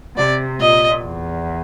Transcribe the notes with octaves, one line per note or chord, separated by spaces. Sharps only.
C3 D5
A#2 D#5
E2